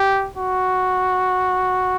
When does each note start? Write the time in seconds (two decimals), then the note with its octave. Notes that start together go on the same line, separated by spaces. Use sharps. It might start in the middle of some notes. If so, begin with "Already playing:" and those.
Already playing: G4
0.38 F#4